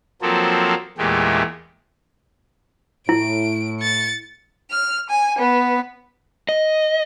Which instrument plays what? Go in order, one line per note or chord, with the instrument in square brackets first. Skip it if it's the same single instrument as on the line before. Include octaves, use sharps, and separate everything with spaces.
[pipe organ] F3 F#3 A#3 C4 A4
E2 A#2 G#3 A3 G4
[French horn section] A2 [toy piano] E4 [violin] D7
[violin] A6 C#7
[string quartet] F6
G#5
B3
[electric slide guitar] D#5